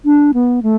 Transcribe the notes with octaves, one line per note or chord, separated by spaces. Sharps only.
D4
B3
A3